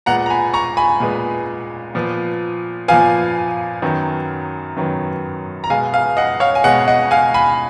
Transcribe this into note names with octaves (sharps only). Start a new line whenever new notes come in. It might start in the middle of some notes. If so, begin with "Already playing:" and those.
A#2 G#3 B3 F#5 A#5
A#5
G#5 B5
A#5 C#6
G#5 B5
A#2 G#3 B3
A#2 F3 B3
A#2 F3 B3 F5 G#5
F#2 D#3 F#3 B3
F#2 D#3 F#3 B3
A#5
B2 G#3 B3 F5 G#5
F5 G#5
D#5 F#5
C#5 F5
G#5
B2 G#3 B3 D#5 F#5
D#5 F#5
F5 G#5
G#5 B5